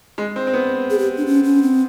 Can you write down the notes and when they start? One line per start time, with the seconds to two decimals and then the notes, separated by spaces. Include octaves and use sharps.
0.18 G#3
0.36 C4
0.47 C4
0.54 B3
0.90 G#4
0.99 G4
1.17 D4
1.26 C#4
1.44 C#4
1.62 C4